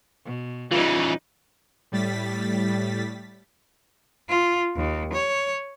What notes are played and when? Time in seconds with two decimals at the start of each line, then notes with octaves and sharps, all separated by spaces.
0.25 B2
0.71 C#3 E3 G3 D#4 F4 B4
1.92 A2 G3 A6 B6
4.29 F4
4.76 D#2
5.13 C#5